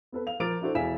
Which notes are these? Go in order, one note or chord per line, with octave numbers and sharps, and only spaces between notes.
B3 A4 B4
F5 F7
F3 A#4 D6 A6 D7 F7
D4 E4 F#4 A4 C5
E1 E4 F5 G#5 B6 E7